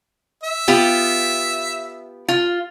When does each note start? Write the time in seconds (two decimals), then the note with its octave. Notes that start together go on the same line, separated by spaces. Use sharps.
0.44 E5
0.68 B3 F4 G4
2.28 F4